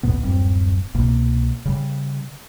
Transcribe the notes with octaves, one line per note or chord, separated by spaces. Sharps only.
A#1 D#2 A#2 B3
D1 F#2 G3 C4
C2 B2 A#3
C#3 G3